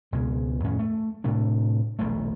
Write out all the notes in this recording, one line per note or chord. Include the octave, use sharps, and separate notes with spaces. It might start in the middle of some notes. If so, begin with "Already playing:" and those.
C#2 B2 G#3
F2 A2 D#3 C#4
A3
A2 C3 A3 D4
D#1 A#1 B2 A3